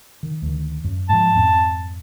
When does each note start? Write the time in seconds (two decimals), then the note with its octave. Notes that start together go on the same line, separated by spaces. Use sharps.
0.23 D#3
0.42 D2 D#3
0.84 F#2
1.09 G#2 F3 A5
1.35 F2 G#2 C4